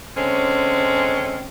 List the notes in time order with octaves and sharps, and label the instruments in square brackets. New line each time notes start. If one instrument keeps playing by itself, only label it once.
[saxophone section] D3 G#3 C4 C#4